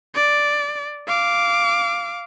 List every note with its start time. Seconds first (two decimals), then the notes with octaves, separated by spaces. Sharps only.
0.15 D5
1.08 F5 D6